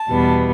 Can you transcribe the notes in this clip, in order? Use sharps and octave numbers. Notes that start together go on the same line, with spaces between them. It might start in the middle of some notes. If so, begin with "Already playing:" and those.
Already playing: A5
E2 B2 G3 B3